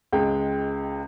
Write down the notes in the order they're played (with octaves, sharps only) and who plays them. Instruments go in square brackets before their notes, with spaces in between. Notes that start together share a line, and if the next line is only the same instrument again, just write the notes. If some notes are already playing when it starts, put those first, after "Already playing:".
[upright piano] C#2 G#3 G5